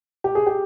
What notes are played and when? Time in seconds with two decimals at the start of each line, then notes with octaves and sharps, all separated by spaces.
0.24 G4
0.35 G#4
0.47 G4